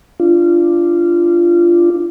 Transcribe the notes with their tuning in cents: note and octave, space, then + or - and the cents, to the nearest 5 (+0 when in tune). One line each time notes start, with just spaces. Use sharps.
D4 +0 F4 -20